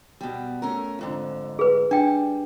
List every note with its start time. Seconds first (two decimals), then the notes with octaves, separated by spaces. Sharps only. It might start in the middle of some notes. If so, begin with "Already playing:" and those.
0.21 B2 G3
0.62 A3 C#4 A#4
0.99 F2 G#2 D3
1.59 G#4 B4
1.91 G3 D4 G5